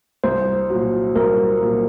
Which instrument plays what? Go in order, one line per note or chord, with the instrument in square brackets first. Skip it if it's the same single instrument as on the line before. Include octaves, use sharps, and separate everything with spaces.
[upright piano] C2 [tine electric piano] C5
[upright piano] A#2 F#3
[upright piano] C2 [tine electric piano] A#4
[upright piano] A#2 F#3